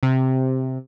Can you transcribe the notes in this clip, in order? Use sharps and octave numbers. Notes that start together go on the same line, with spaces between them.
C3